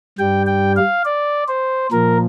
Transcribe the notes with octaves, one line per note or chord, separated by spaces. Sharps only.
G2 G3 G5
G5
F5
D5
C5
A#2 F3 A#4